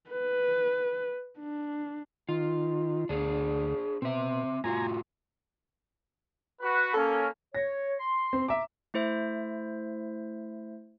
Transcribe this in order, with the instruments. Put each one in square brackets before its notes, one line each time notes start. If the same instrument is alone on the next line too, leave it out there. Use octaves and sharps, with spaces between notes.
[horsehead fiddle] B4
D4
[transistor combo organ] D#3 [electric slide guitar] F4
[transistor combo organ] D2 [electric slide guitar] D4 G#4
[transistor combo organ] B2 [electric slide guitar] C4 E5
[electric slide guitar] A2 F4 F#4 [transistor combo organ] G#5 A#5
[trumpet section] F#4 B4
[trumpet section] A#3 C#4 [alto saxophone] A4
[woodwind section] C#5 [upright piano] A#6
[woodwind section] C6
[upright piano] C4
E5 A#5 D6
[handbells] A3 E4 C5 E5